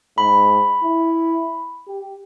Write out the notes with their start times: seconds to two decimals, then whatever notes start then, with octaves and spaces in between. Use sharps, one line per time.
0.18 G#2 B5
0.83 E4
1.88 G4